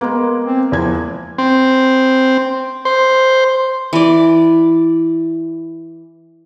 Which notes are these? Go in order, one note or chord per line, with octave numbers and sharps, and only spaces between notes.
G#3 A#3 B3
C4
E2 F3 G#6
C4
C5
E3 D5